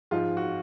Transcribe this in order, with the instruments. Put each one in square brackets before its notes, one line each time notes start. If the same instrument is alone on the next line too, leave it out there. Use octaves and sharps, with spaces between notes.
[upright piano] G#2 F3 G#3 D#4 [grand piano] F4
[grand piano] F#4